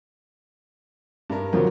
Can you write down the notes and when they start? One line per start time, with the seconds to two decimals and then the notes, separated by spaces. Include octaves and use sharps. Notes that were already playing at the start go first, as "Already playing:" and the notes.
1.30 G2 D4 A#4
1.53 F2 D3 F3 F#3 A#4